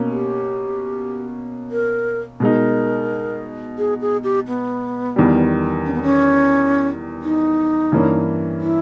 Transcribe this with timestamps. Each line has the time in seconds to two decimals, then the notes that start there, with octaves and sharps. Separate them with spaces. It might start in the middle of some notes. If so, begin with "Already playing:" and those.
Already playing: B2 A#3 C#4
0.11 G4
1.71 A#4
2.40 B2 G#3 D#4 A#4
3.78 G#4
4.01 G#4
4.24 G4
4.47 B3
5.16 E2 D#3 G3
5.85 C#4
5.94 B3
6.03 C#4
7.23 D#4
7.92 G2 E3 A#3 C#4
8.61 E4